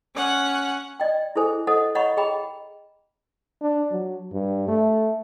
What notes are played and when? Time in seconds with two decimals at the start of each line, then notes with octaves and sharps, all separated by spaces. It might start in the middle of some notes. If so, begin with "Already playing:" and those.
0.15 C#4 F#5
1.00 D5 D#5 G5
1.36 E4 G#4 A4 C5 G#5
1.67 A4 C5 D#5 F#5
1.95 C#5 D#5 F#5 A#5 B5 C#6
2.17 G#4 D#5 G5 A#5 B5
3.62 D4
3.91 F#3
4.32 G2
4.68 A3